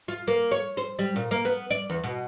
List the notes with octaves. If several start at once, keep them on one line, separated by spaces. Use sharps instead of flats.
F4
A#3
C#5
C5
G3
A#2
A#3
B3
D5
E2
B2